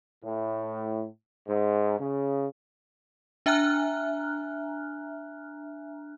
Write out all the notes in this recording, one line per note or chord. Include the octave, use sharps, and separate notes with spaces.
A2
G#2
C#3
D4 E5 G#5 A#5 F6 F#6